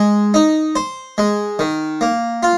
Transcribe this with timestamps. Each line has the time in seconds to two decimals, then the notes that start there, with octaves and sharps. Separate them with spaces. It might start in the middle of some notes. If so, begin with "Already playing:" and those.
Already playing: G#3
0.34 D#4
0.76 C5
1.18 G#3
1.59 D#3
2.01 A#3
2.43 F4